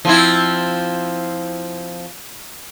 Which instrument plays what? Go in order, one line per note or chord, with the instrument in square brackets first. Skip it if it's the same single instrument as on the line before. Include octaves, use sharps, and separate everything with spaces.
[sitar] F3 C4 E4